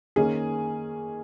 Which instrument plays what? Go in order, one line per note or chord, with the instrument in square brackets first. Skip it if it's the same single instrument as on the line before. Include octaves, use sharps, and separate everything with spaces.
[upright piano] D#3 A#3 C#4 G#4